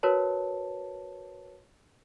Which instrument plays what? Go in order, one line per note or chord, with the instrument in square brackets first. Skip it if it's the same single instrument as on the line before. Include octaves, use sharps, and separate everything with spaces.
[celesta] F#4 A#4 B4 C#5 A5